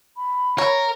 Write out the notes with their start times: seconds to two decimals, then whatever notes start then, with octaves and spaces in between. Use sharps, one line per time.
0.17 B5
0.58 A#4 C#5